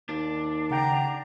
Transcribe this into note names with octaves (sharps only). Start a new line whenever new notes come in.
D#2 D4
C#3 F#5 G5 A#5